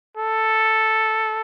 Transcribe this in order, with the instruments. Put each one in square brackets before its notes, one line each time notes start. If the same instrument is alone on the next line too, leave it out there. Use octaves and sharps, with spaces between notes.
[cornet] A4